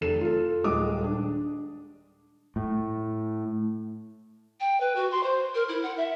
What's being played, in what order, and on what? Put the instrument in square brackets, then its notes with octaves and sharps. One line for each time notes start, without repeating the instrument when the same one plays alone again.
[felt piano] F1 A4 E7
F4 A4
D#1 G3 G#3 D6 D#6
D4
[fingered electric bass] A2
[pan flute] G5
B4
F#4
C6
C5
A#4
E4
F#5
E5